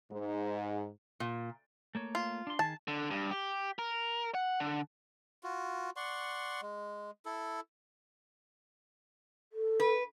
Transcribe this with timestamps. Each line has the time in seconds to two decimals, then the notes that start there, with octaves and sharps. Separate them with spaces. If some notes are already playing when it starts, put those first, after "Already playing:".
0.11 G#2
1.20 A#2
1.95 A3 A#3 C#5
2.15 F4
2.47 D4 C6
2.59 D#3 G#4 A5
2.88 D3
3.11 G2
3.31 G4
3.79 A#4
4.35 F#5
4.60 D3
5.43 F4 F#4
5.96 D5 F#5 C6 C#6
6.62 G#3
7.26 E4 A4
9.52 A4
9.80 B4